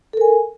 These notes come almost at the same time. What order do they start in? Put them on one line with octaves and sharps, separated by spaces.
A4 A#4 G#5